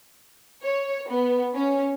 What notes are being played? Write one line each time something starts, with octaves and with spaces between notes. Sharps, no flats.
C#5
B3
C#4